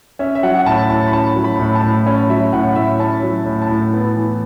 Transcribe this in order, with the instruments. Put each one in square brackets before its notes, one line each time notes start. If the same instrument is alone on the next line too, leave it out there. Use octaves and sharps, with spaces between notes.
[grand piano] C#4 E5
E5
F#3 F#5
F#5
A2 A5
A2 A5
B5
C#4 A5
F#3
B5
A2
A5
A2
C#4
F#3 E5
A2 F#5
A2 E5
C#4 A5
F#3
A2
A5
A2
B3
E3